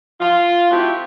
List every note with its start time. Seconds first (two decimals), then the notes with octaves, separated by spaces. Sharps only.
0.20 F4
0.71 A3 C4 E4 F#4 G4